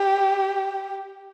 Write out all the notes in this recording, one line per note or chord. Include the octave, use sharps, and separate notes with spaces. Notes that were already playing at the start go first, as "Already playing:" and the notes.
Already playing: G4